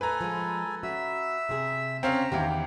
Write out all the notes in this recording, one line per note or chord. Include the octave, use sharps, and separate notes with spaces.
A2 A4 B4 G#5 A#5
F3 G#3
C#4 F#4 E5 E6
C3 G#4
C#3 C4 C#4 F5 A#5
E2 D#3 G4 E5 F5